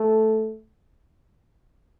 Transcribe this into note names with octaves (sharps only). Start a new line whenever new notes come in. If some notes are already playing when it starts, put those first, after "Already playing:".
Already playing: A3